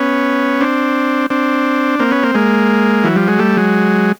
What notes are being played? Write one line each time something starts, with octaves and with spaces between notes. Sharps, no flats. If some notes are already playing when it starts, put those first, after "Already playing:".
Already playing: B3 C#4
C4 D4
C4 D4
A#3 C4
B3 C#4
A#3 C4
G#3 A#3
E3 F#3
F3 G3
F#3 G#3
G3 A3
F#3 G#3